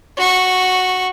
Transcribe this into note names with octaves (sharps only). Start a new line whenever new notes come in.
F#4 C#6